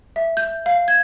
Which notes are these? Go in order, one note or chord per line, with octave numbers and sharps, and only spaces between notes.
E5
G6
F5
G#6